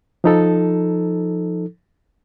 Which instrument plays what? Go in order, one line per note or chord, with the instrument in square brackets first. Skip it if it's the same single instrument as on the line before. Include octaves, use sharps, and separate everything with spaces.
[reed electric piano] F3 D#4 A4